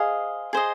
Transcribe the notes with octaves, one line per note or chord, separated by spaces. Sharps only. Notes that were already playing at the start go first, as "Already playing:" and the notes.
Already playing: G#4 C5 D#5 F5
G#4 C5 D#5